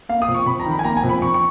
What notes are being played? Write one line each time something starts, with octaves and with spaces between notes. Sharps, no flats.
A#3 F5
D#6
F2
C#6
F2 B5
A#5
D#3
B5
G#5
A#3 A#5
G#5
F2
B5
F2 C#6
C#6